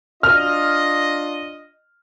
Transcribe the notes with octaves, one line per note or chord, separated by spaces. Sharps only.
D4 F4 D#5 F6